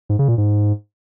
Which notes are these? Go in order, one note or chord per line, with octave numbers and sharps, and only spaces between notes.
G#2
C#3
A#2
G#2